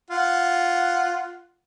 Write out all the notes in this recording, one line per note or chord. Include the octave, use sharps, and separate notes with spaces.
F4 F#5